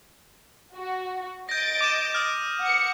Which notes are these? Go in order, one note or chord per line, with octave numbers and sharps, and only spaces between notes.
F#4
D#5 G6 A6 A#6 D7
D6 D#7 E7
D#6 F6
F#5 C#7